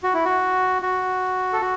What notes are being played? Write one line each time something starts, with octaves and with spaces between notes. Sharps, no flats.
F#4
E4
F#4
F#4
A4
F#4